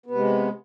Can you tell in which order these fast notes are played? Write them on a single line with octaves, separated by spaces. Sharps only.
B3 C3 G#3